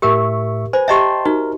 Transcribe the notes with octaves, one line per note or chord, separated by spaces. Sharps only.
A2 G4 A#4 E5 C#6
B4 C5 G#5
G4 D#5 E5 G5 A5 C6
D#4 F#4 A#4